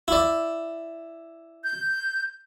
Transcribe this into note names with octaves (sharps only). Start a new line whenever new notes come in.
E4 D5
G6